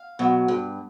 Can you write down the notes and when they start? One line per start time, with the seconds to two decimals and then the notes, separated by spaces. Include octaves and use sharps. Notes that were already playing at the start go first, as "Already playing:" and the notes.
Already playing: F5
0.19 B2 F#3
0.48 G2